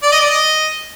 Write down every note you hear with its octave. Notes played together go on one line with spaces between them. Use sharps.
D5
D#5
D5
D#5